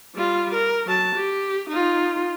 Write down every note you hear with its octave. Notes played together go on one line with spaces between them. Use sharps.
G3 F4
A#4
F#3 A5
G4
D#4 F4